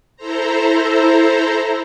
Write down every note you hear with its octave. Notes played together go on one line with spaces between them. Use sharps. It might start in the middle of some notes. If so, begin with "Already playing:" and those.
E4 A4 C5 A#5